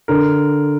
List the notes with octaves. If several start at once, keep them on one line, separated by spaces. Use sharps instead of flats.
D3 A#4